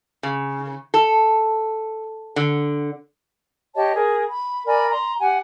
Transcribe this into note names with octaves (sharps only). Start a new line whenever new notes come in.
C#3
A4
D3
G4 C#5 D#5 A5
G#4 A#4
B5
A#4 D5 G#5 B5
A#5 C6
G4 F#5 G#5